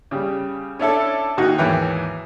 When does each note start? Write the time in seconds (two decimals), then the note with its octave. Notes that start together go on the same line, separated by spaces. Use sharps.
0.11 C#3 G3
0.79 C#4 D4 E4 A4
1.37 A#2 D#3 D#4 F#4
1.58 D#2 G#2 E3 C#5 G5